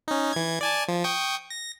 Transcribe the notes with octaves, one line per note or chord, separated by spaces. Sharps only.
C#4 D#4
E3 G#6
D5 G#5 A5
F3
G5 C#6 D#6
A#6